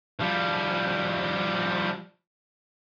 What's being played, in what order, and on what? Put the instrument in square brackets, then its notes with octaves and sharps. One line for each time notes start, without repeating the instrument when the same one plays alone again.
[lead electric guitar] F3 G3